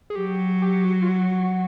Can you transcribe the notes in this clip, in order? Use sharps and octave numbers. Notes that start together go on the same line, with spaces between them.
G#4
F#3 G4
G4
F#4
F4
F#4